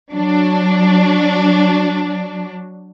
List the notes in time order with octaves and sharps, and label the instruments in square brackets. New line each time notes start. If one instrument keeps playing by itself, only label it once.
[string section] F#3 D4